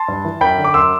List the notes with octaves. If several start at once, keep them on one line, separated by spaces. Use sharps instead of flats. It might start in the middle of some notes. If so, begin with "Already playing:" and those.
Already playing: A5 C6
G2
E3
F#2 G5 B5
D3
D6
F#2 C6 E6